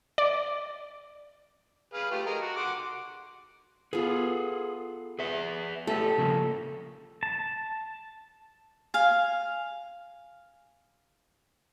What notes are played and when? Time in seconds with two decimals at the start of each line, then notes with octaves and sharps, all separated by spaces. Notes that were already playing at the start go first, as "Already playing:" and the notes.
0.18 D5
1.94 G#4 B4 F5
2.11 A3 F4 G4
2.26 G#4 A#4 D#5
2.41 F#4
2.56 F#5 C6 D6
3.93 B3 F4 G#4 A4
5.19 G#4 B4 E5
5.87 A3 G4 A4
6.18 C#3 F3 A#3
7.23 A5
8.94 F5 G#5